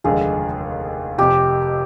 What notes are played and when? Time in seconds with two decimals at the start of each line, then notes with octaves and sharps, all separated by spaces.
0.04 F1 D#2 D3 F3 G#3 G#4
1.18 F1 F2 C3 G4